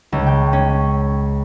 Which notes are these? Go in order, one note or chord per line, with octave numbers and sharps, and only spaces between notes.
C#2
G5
C#4